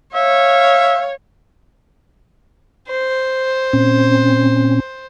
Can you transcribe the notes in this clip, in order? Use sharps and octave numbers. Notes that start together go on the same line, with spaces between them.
C#5 E5 F5
C5
A#2 C4 C#4